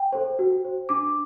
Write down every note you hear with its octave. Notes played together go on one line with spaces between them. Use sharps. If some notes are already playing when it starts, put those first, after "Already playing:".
Already playing: G5
A4 C5
F#4
C5
D4 D6